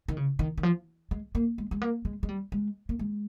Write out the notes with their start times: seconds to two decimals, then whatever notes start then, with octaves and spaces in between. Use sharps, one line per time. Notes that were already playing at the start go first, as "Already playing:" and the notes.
0.08 D#3
0.17 C#3
0.39 D#3
0.58 D#3
0.63 F3
1.11 G#3
1.35 A#3
1.58 G#3
1.71 G#3
1.82 A#3
2.05 G#3
2.23 G#3
2.29 G3
2.52 G#3
2.89 A#3
2.99 G#3